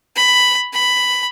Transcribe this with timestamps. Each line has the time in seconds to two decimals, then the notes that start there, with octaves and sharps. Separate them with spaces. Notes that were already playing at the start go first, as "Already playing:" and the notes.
0.16 B5
0.73 B5